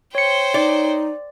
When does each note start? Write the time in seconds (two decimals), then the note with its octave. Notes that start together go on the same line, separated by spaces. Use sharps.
0.15 C5 C#5 G5 C#7
0.54 D#4 D5